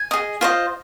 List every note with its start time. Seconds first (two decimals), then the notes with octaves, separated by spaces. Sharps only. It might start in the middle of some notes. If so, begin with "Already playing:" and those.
Already playing: G#5
0.11 G#4 D#5
0.41 F4 C5 D#5